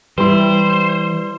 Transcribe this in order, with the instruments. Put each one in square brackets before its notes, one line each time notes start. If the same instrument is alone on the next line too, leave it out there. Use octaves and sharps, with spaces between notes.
[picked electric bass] E3 [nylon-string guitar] G3 E4 [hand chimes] B4 C6 [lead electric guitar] C5